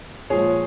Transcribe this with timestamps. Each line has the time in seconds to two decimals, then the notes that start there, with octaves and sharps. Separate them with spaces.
0.30 A#2 F3 G#3 G#4 C#5